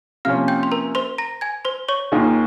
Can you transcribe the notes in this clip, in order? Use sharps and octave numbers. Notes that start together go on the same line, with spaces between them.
C3 F3 A#3 C#4 F5 F6
G5 G6
C6
A#4 A#5
C5 C6
A#5 A#6
G#5 G#6
C5 C6
C#5 C#6
D#2 D#3 A#3 F4 G#4